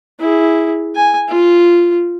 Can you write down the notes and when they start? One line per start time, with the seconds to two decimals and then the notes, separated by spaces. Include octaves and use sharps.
0.20 E4 G#4
0.95 G#5
1.29 F4